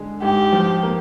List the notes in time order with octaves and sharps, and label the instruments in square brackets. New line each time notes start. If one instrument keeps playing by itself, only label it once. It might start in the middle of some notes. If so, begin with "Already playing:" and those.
Already playing: [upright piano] D3 G#3
[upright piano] G#2 [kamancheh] G4
[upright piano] F3
A#3